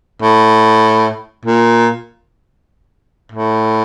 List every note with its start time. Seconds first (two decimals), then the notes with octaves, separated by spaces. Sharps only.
0.22 A2
1.45 A#2
3.32 A2